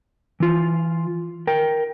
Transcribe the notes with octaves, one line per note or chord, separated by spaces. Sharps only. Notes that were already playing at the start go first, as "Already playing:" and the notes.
E3 F4
A#4 G5